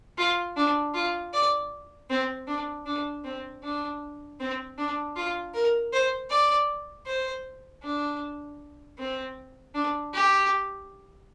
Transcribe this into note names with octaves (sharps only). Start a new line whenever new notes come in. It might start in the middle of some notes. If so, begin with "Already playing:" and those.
F4
D4
F4
D5
C4
D4
D4
C4
D4
C4
D4
F4
A#4
C5
D5
C5
D4
C4
D4
G4